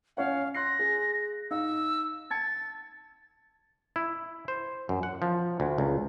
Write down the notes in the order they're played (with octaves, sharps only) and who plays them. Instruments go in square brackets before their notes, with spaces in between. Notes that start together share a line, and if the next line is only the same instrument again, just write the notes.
[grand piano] C#4 C#5 F#5 [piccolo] F5
[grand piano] C6 F#6 C7 [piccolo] A#6
[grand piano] G#4
[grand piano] D#4 F5 [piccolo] E6
[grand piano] A5 G#6 C#7 [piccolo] A6
[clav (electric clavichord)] E4
C5
F#2
F#5
F3
D2
C#2